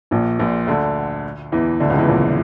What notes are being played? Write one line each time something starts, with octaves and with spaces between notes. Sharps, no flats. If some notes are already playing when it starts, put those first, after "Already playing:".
A#1 A#2
A#1 A#2
D2 D3
E2 E3
D2 D3
C#2 C#3
E2 E3
A#1 A#2